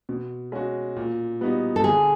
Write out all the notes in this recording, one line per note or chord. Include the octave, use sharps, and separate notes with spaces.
B2
G#3 C#4 F#4
A#2
G3 B3 D#4 F#4
A4
D3 G#4